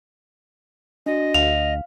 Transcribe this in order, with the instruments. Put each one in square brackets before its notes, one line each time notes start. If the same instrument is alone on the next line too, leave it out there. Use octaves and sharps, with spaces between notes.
[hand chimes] D4 F#4 [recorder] D#5
[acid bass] D2 [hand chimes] F5 [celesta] F7